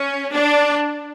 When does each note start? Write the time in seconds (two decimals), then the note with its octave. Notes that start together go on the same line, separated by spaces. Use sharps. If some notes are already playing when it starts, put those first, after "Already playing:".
Already playing: C#4
0.32 D4